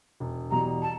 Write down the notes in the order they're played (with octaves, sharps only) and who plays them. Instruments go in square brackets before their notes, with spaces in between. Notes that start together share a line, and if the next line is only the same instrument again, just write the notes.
[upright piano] E1
[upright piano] E2 B2 G3 [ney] A#5
[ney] A5